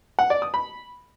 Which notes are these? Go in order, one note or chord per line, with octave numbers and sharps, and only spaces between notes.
F#5
D5
D#6
B5